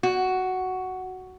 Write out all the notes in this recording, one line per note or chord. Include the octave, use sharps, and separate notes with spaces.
F#4